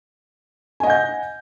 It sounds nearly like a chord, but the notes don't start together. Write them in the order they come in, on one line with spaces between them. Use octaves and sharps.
G#5 D#5 F#5 G6